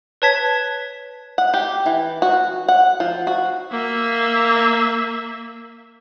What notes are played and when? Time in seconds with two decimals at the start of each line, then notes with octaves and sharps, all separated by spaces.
0.22 B4 C#5 A5 G#6 B6
1.38 F#5
1.54 G4
1.86 E3
2.22 F#4
2.68 F#5
3.00 F3
3.27 F#4
3.72 A#3 E5